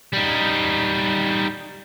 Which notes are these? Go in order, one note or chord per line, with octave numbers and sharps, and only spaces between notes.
G3 D#4